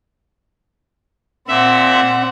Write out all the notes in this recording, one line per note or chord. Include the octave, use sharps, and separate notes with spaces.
A#2 C4 E5 F#5